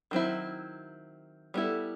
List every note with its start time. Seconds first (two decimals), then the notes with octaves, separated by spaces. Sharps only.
0.11 D#3 F#3 C4 E4
1.54 G3 B3 E4 A4